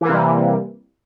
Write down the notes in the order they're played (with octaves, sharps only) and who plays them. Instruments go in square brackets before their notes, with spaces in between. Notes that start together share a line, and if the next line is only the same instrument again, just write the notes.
[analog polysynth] E3
A#3
C3
G3